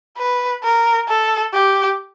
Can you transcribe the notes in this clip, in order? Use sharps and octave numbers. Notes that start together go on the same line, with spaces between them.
B4
A#4
A4
G4